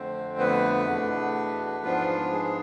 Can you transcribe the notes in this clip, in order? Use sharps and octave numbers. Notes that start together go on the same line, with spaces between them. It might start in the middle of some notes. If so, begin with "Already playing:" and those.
Already playing: F2 D3 A3 C4 C5
B3 B4
E2 B2 A3 D4
G#2 F3 B3 D4 F4
F4
G#3 G#4